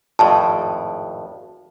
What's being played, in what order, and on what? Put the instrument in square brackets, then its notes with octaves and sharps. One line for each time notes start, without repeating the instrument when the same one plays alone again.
[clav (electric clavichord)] G#1 F2 A2 [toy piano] A5